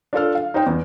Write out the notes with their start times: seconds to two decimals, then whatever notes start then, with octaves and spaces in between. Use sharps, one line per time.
0.13 D4 F4 A4 F6
0.35 F5
0.54 D#4 C5 G5
0.66 E2